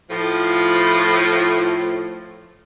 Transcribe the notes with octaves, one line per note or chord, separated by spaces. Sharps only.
A2 F3